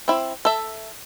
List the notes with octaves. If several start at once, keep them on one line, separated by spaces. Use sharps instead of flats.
C4 E4
A4 E5